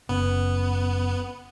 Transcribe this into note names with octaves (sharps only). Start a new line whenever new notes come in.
F#1 C#3 B3